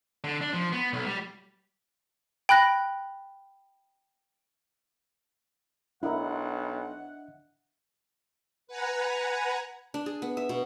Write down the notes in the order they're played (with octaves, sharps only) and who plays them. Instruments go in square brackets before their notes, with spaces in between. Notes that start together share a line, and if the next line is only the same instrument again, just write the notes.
[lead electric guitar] D3
D4
F3
B3
B1
G3
[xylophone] G5 B5 F#6 A#6
[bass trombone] B1 [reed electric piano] D4 D#5 E5 [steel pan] E4 A#4 [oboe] F#5
[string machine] B4 F#5 G#5 A#5
[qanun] D4
G#4
B3
E5
B2